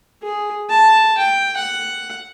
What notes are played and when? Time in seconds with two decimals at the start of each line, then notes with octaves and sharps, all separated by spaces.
0.23 G#4
0.70 A5
1.18 G5
1.57 F#5